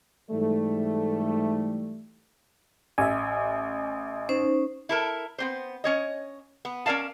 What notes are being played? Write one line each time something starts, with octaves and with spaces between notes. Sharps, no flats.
G#2 E3 G3 A3
A1 E5 G#5
C#4 D#4 C5
E4 A4 A#4
B3 C4 C5
C#4 C#5 D#5
B3
C#4 A#4 D5 F5 A5